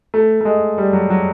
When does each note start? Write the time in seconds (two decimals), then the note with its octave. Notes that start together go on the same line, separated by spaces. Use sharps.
0.14 A3
0.41 A3
0.45 G#3
0.78 G3
0.93 F#3
1.10 F#3